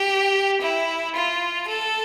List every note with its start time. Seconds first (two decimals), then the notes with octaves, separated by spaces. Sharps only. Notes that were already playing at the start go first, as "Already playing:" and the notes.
Already playing: G4
0.61 E4
1.15 F4
1.68 A4